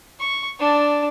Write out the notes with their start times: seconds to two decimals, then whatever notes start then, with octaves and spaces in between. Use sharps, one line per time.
0.19 C#6
0.60 D4 A5